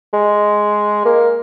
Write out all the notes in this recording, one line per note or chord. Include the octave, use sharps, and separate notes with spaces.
G#3
A#3